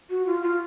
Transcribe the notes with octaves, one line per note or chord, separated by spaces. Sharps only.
F#4
F4
F4